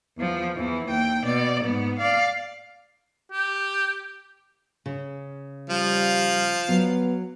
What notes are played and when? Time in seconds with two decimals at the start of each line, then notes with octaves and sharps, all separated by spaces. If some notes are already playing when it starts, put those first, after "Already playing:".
0.17 E2 F3
0.56 E2 E3
0.86 D#2 G5
1.24 B2 D5
1.64 G#2 B3
1.99 D5 F5
3.32 G4
4.86 C#3
5.70 F3 G3 F5
6.69 F#3 B3